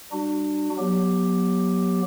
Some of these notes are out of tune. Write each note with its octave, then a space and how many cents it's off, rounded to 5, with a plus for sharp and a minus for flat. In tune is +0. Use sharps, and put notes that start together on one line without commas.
G3 +0 D4 +35 F#4 +25
F#3 -10 B3 -30 G4 +0